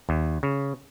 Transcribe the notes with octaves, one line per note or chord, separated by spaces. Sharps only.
D#2
C#3